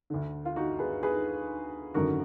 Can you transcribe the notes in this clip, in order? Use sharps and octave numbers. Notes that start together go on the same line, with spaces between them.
D2 D3
F4
D#4 F#4
G#4 B4
G#4 B4
G#1 F#2 D3 F#4 A#4